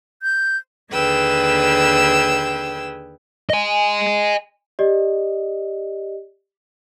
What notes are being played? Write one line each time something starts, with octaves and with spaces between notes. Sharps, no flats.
G6
D#2 D3 G#4 B4 G5 E6
D#5 G#5
G4 D5 D#5